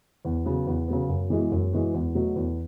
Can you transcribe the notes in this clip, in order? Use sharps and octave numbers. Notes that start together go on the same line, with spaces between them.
E2
C#3 F#3 B3
E2
C#3 F#3 B3
F#2
E3 G#3 B3 F#4
F#2
E3 G#3 B3 F#4
E2
B2 F#3 A3
E2